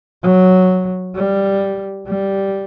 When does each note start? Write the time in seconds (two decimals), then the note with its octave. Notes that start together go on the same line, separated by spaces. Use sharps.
0.23 F#3
1.15 G3
2.07 G3